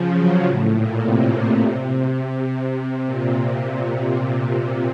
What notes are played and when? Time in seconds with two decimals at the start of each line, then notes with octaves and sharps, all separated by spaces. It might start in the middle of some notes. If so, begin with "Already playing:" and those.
Already playing: C#3 F3
0.15 F#3
0.44 A2
0.72 A#2
1.02 C3
1.32 A#2
1.60 C3
2.77 C3
3.06 A#2
3.35 A#2